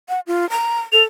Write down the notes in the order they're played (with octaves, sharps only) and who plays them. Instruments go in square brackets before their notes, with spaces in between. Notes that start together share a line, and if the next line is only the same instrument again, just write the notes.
[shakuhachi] F#5
F4
A#5
[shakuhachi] A4 [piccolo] F7